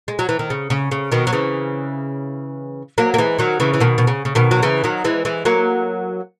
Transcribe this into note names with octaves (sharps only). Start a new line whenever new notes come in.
G#3
F#3
E3
D#3
C#3
C#3
C#3
B2 D#3
F#3
C#3 E3
F#3 A#3
A#3
E3 G#3
D#3 F#3
C#3 E3
E3
B2 D#3
B2
C#3
C#3
B2 D#3
F#3
C#3 E3
D#3 F#3
E3 G#3
E3 G#3
F#3 A#3